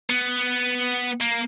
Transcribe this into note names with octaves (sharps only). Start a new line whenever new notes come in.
B3
A#3